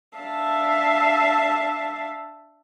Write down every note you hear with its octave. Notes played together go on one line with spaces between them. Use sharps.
D4 E5 F5 A5